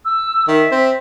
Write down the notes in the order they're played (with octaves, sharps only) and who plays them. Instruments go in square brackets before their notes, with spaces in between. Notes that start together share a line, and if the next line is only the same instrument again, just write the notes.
[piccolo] E6
[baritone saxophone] D#3 [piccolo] E5
[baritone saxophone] C4